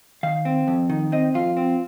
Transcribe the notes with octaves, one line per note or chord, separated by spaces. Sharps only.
D#3 F5
C4
F2
D#3
C4 D#5
F2 F4
C4